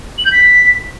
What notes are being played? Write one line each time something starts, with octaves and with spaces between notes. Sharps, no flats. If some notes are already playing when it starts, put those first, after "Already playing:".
F#7
G6
B6